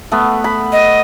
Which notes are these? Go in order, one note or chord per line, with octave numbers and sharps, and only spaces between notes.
A3 B3
B5
D#5